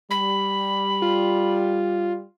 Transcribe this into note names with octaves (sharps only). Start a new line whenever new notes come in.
G3 B5
F4